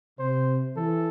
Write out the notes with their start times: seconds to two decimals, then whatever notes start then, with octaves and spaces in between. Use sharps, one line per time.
0.19 C3 C5
0.76 E3 A4